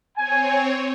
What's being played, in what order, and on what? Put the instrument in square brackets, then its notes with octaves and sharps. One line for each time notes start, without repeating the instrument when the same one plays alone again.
[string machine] C4 C#5 [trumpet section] G#5